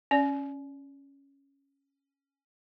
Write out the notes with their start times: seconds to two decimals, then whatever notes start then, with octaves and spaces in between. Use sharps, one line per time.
0.11 C#4 D5